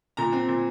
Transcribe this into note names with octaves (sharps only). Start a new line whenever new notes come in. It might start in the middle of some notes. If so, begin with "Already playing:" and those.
A#2 A#5
C4
A#2